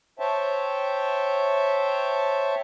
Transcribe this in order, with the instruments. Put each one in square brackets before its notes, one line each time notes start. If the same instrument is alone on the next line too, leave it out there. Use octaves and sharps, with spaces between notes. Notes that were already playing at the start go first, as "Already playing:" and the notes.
[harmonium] C5 C#5 E5 G5 A5